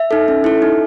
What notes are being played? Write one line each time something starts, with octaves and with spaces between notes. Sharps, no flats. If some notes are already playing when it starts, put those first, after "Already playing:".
Already playing: E5
D#4 A4
C#4
E4 A4
D#4